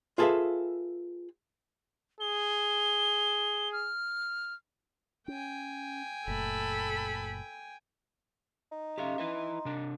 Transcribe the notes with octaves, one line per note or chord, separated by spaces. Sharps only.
F4 G#4 A4 B4 E5 F5
G#4 G7
F6
C#4 G5 G#5
F#1 A#2 A3 A4 B5
D#4
C#4 G4 A4 E5 F5 C6
E4 B4 E5 A#5 C6
C3 D4